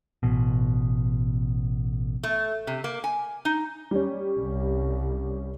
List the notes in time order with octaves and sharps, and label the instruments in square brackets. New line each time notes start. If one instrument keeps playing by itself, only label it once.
[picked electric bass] A1 B2
[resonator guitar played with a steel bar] A3
C3
A#3
G#5
D#4
[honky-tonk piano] G3 C#4
[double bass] C2